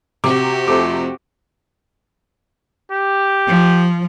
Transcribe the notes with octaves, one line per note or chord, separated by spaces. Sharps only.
C3 F#4 G4 D6
F2 A3 D6
G4
F3